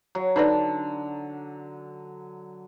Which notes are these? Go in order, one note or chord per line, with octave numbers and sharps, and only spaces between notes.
F#3
D3 D#4 B4 D5